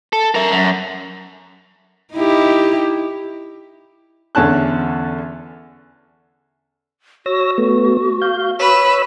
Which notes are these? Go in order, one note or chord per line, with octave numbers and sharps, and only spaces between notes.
A4
A#4 E5
F#2
D#4 E4 G4
E2 D3 C#4 A5 F#6
F#4 C#5 E6 A#6
A3 B3
F5 G6
B4 C#5 B5 E6